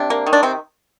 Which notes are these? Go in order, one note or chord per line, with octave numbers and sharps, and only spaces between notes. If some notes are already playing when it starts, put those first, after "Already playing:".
Already playing: C3 D4
A#3
D#3
D4
C3 C4